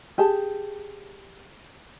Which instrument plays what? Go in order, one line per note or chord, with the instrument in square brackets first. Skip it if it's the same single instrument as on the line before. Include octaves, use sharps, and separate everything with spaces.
[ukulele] G4 G#4 A5